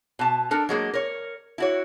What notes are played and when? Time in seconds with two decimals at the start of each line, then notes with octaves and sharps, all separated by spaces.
0.19 B2 A5
0.51 D4 A4 A#4
0.69 F#3 G#3 A#3
0.94 A#4 C#5
1.58 E4 F#4 C#5